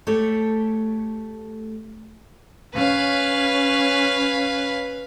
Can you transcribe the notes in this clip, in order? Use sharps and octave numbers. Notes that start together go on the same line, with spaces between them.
A3 G4 A4 C#5
C#4 B4 F5